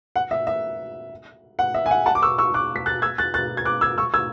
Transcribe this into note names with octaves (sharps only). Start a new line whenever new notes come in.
F#5
E5
E5
F#5
E5
G#5
F#5
F#5 A5
D6
C#6 E6
C#6 E6
D6 F#6
B6
F#6 A6
E6 G#6
F#6 A6
F#6 A6
G#6
D6 F#6
E6 G#6
C#6 E6
E6 G#6